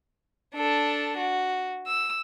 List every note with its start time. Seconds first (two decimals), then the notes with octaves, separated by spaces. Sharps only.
0.55 D4 A4
1.18 F#4
1.87 E6